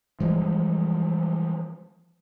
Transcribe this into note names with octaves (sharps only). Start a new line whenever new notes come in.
E3 F3 G3 G#3